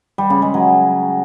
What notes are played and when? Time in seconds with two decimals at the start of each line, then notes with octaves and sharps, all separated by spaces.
0.18 G3
0.30 C#3
0.42 G#3
0.54 F#3